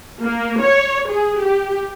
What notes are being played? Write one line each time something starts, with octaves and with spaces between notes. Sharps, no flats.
A#3
C#5
G#4
G4